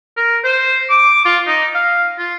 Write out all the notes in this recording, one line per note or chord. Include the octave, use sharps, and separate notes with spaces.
A#4
C5
D6
F4
D#4
F5
F4